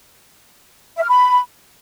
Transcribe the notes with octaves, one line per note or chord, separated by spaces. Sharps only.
E5
F6
B5